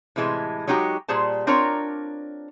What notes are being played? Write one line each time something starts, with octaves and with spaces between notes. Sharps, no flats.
A2 C3 E3 G#3 A5
F#3 G#3 D#4 F#4 G4
A#2 G3 G#4 C5 A5
C4 D4 F4 A#4 C#5 A#5